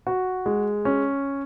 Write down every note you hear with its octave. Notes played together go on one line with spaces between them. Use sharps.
F#4
G#3
C#4